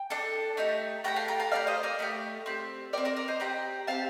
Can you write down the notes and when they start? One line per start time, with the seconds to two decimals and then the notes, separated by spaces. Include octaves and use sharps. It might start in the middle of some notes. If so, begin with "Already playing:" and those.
Already playing: G5
0.10 D4 A4
0.57 A3 D#4 G4
1.04 A3 D#4 G4 G5 A#5
1.16 F5 A5
1.28 G5 A#5
1.40 F5 A5
1.51 A3 D#4 G4 D5 F5
1.67 C5 D#5
1.83 A#4 D5
1.99 A3 D#4 G4
2.46 C4 G4
2.93 C4 G4 A#4 D5
3.05 A#4 D5
3.16 A#4 D5
3.28 C5 D#5
3.40 C4 G4 G5 A#5
3.87 C4 G4 F5 A5